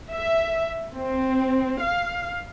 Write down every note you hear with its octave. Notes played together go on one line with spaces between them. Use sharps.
E5
C4
F5